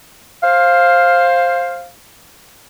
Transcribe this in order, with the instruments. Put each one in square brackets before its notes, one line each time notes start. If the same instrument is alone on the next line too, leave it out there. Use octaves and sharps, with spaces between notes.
[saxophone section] C5 F5